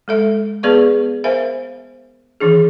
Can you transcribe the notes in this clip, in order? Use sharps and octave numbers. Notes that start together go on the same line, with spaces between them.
G#3 A4 E5
B3 G#4 B4 D5 F5 C#6
A#4 C5 E5 F5 G#5
D#3 E3 D4 G#4